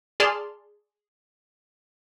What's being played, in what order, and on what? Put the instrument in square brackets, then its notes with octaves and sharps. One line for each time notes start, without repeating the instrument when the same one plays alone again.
[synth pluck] G#4 D5 A5 C6 F6